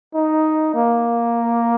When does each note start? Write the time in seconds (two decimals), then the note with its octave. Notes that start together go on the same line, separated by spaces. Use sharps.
0.14 D#4
0.75 A#3